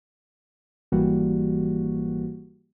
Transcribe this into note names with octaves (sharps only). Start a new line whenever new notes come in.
G#1 E3 G3 A#3 F#4